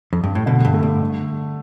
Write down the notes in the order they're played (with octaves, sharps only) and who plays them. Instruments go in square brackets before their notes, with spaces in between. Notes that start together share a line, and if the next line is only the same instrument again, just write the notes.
[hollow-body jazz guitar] F2
G2
A2
[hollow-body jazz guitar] B2 [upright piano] D3
[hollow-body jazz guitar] F2
G2
[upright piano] A3
[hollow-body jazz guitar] G2
[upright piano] D3